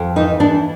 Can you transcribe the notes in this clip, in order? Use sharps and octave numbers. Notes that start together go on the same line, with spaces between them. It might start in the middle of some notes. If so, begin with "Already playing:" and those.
Already playing: F2
E3 D#4
E3 D4